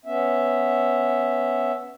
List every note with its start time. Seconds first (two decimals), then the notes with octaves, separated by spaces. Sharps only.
0.05 B3 C#4 E5